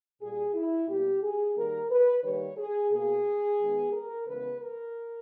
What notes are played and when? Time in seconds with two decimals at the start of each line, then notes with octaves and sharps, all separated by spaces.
0.21 A#2 G3 A#3 G#4
0.54 E4
0.88 B2 G3 A#3 G4
1.22 G#4
1.56 D#3 G3 A#3 A#4
1.90 B4
2.23 D#3 G3 A#3 C#5
2.57 G#4
2.91 B2 A#3 G#4
3.59 D#3 G#3 B3
3.92 A#4
4.26 C#3 E3 G#3 B3 B4
4.60 A#4